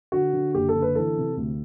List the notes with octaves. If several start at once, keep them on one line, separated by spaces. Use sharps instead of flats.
D3 F#4
D3
F#1 G4
A4
D3
B4
E3 A4
C3
D2